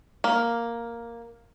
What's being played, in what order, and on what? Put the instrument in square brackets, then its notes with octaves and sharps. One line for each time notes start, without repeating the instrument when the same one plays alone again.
[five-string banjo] A#3